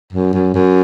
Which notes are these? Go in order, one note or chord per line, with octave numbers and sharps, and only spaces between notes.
F#2
F#2
F#2